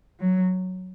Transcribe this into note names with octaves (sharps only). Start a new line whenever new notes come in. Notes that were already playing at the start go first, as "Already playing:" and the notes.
F#3